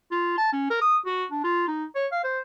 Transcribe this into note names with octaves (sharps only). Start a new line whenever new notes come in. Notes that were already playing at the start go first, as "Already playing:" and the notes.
F4
A5
C#4
A#4
D#6
F#4
D4
F4
D#4
C#5
F5
C5